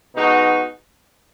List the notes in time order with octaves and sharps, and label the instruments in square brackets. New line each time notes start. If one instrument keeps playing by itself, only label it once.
[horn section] B2 G#3 D#4 F#4